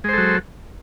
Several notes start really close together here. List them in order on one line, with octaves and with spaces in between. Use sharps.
G#3 C5 A4 F#3